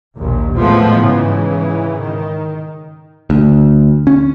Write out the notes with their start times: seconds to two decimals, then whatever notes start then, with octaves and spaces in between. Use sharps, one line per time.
0.17 A#1 D#2
0.55 A2 F3 G#3 B3
1.02 G#2 C#3 E3
2.02 D#3
3.30 D2
4.07 C#4